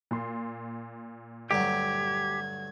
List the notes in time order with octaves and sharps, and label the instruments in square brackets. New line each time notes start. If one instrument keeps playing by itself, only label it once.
[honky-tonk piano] A#2 C6
[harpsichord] D2 G2 F#3 [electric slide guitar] G4 [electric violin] G#6